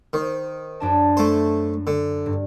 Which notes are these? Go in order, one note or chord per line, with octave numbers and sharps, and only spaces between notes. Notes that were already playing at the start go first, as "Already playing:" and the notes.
D#3 C5
F#2 D4 A5
A3 C5
D3
G2